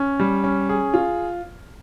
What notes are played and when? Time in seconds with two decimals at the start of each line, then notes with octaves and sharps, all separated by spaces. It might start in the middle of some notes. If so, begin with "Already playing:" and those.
Already playing: C#4
0.20 G3
0.44 C#4
0.69 G#4
0.94 F4